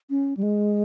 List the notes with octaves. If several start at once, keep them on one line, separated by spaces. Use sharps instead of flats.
C#4
G3
G#3